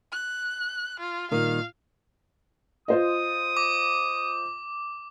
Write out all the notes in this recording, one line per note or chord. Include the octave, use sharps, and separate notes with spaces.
F#6
F4
A#2 D#3 G3 F5
F4 C5 D#5 D#6
D6